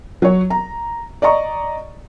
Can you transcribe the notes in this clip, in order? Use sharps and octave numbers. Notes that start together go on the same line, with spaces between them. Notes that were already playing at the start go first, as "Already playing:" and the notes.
F#3 C#5
A#5
D5 D#5 A#5 C#6